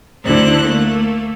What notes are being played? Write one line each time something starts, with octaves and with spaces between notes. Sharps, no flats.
D2 D3 E4 C5 F#6
A3 A#3